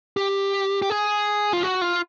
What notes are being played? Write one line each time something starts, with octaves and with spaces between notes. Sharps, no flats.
G4
G4
G#4
F4
F#4
F4